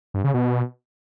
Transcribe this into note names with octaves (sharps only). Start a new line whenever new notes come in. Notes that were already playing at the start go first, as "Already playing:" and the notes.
G2
C#3
B2